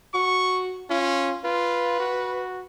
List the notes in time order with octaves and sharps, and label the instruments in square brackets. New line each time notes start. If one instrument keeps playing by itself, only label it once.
[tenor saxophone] F#4 [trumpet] C#6
[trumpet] C#4 [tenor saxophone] F4
[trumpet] F4 [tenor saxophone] B4
[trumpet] F#4